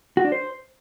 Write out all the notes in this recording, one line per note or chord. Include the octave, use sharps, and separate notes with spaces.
F#4
D4
C5